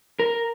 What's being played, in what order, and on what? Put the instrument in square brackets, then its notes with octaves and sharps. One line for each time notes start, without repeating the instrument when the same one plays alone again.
[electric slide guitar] A#4